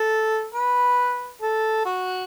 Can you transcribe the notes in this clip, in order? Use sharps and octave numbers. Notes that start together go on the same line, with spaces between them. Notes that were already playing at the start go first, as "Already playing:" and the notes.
Already playing: A4
B4
A4
F#4